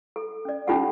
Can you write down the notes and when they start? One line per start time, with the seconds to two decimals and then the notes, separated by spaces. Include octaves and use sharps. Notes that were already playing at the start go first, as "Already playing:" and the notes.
0.16 A4
0.45 C#4 D5
0.67 C#4 D#4 F4 G4 A4 F#5